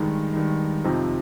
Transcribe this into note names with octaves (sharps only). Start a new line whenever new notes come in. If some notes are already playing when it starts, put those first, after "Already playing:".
Already playing: G2 D#3 G#3 D#4
G2 D#3 G#3 D#4
F2 C3 F3 C4 D#4